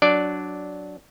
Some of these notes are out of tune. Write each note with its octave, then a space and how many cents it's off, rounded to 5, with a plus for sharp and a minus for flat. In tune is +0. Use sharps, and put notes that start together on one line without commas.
F#3 +0 D4 -5 D5 +0